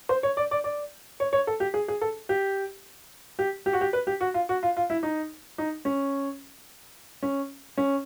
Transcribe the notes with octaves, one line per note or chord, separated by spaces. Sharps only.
C5
C#5
D5
D5
D5
C#5
C#5
A4
G4
G#4
G#4
A4
G4
G4
G4
F#4
G4
B4
G4
F#4
F4
F#4
F4
F4
E4
D#4
D#4
C#4
C#4
C#4